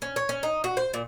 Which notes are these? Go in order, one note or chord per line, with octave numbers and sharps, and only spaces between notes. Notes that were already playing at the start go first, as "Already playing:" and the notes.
C#4
C#5
C#4
D#4
F#4
C5
A#2